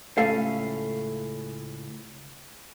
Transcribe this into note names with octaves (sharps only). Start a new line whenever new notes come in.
C#2 A2 A3 C#4 A4 F5